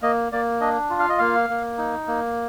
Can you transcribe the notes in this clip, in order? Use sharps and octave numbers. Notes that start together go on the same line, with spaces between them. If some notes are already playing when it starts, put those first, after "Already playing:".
A#3 D#5
A#3 D5
D4 D#5
F4
F5
D#5
A#3 F5
A#3
D#4
A#3